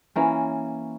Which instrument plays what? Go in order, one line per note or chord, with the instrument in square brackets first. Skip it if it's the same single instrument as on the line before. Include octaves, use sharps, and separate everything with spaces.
[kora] E3 A#3 C#4